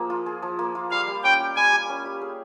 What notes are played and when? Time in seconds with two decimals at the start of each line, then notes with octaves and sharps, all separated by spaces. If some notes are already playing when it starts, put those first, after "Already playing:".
Already playing: F3 A#3 G#4
0.10 F4
0.26 G#4
0.42 F3
0.59 A#3
0.75 F4
0.91 G3 F5
1.07 G3
1.24 C#4 G5
1.40 G4
1.56 G3 G#5
1.73 G3
1.89 C#4
2.05 G4
2.21 G#4